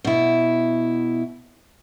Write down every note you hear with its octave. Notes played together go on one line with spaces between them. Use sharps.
B2 E4